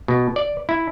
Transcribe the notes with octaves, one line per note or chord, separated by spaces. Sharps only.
B2
D5
E4